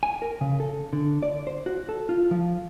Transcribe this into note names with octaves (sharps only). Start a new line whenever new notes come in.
G#5
A#4
C#3
A4
D3
D5
C5
F#4
A4
F4
F3